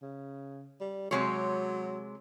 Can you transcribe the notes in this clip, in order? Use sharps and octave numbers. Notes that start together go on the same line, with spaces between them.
C#3
G3
C3 F#3 G#3 C#5